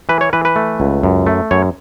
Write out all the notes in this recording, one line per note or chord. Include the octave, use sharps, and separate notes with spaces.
E3 B4
C#5
E3 B4
B4
A3
C#2
F#2
A3
F#2 C#5